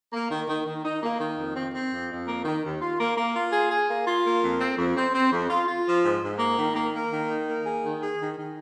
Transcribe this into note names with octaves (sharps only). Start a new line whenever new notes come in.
A#3
D#3
D#3
D#3
D#4
A#3
D#3
F2
C4
C4
F2
F2
A#3
D#3
D#2
F4
A#3
A#3
F4
G#4
G#4
A#3
F4
A#3
F2
C4
F2
C4
C4
F2
F4
F4
F3
G#2
G#2
A#3
D#3
A#3
A#3
D#3
D#4
A#3
G#4
D#3
G#4
D#3
D#3